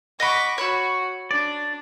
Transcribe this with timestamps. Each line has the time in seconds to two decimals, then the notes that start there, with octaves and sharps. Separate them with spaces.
0.20 D#5 F#5 B5 C#6 D6
0.58 F#4 C#5 B5 E6
1.31 D4 D5